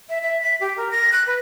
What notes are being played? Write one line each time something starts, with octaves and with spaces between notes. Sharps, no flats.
E5
E5
B6
G4
A#4
A#6
F#6
B4